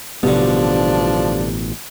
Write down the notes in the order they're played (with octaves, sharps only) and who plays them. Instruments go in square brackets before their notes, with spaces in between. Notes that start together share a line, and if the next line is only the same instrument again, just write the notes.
[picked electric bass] A1 B2 B3 [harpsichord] G2 D3 [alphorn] F3 [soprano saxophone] D4